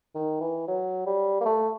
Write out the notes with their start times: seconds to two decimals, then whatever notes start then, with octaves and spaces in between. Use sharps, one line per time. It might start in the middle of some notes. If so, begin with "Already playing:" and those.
0.15 D#3
0.41 E3
0.68 F#3
1.06 G3
1.41 A#3
1.45 A3